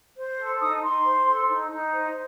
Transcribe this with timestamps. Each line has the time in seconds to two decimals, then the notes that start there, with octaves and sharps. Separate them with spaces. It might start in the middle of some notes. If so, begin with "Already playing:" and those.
0.17 C5
0.38 A4
0.61 D#4 D#6
0.82 D#4 C6
1.06 C5
1.28 A4
1.49 D#4
1.71 D#4
1.92 C5